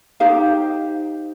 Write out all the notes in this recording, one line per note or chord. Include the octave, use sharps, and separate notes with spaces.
D#4 G4 C5 F5